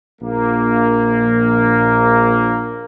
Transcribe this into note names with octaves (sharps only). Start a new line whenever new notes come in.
A#1 A#3